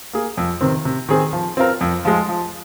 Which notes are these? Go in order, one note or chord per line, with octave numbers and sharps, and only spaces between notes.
A#3 G#4
F2
C3 D#3 C4
C3
D#3 C4 G#4
F3
C4 F4 A#4
F2
F3 G#3 F4
F3